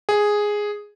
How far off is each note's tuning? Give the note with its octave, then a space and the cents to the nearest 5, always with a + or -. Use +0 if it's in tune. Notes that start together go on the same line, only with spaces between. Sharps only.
G#4 +0